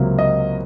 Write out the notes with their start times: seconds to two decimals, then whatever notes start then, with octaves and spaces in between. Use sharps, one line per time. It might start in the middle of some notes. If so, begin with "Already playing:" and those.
Already playing: C#2 C3 F#3 A#3
0.19 D#5